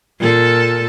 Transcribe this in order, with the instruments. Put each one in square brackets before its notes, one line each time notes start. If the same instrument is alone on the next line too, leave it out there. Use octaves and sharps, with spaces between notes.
[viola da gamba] A#2 A4